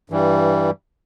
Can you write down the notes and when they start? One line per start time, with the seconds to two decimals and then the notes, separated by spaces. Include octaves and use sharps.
0.10 G2 E3 G3